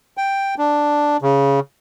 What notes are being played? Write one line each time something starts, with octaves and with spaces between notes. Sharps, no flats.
G5
D4
C#3